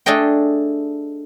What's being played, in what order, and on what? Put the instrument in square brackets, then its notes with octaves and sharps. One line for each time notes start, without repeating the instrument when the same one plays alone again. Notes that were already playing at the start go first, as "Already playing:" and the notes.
[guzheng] A3 D4 G#4 A4 D#5 G5